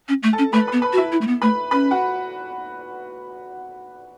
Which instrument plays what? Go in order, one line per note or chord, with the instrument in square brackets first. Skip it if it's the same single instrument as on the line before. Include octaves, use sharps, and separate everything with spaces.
[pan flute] C#4
A3
[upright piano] A4 A5
[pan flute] C#4
[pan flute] A3 [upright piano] B4 B5
[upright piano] B4 B5
[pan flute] B3
[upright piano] B4 B5
[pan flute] F#4
[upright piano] E4 E5
[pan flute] E4
A3
B3
[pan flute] A3 [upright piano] B4 B5
[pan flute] C#4 [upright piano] B4 B5
[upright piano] F#4 F#5